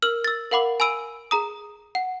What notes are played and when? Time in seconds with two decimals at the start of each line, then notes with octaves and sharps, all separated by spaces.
0.02 A#4 E6 F6 F#7
0.24 E6 A6
0.51 A#4 F5 F#5 B5 D6 F#7
0.80 G#5 B5 E6 D7 D#7
1.31 G#4 A#5 D#6
1.95 F#5